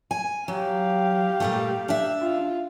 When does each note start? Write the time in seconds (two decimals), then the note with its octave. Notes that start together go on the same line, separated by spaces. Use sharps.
0.11 G#5
0.48 F#3 G4 F5
1.40 A#2 G3 A3
1.88 D4 E5
2.21 F4